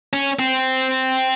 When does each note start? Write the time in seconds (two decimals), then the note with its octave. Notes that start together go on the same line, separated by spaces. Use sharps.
0.13 C#4
0.39 C4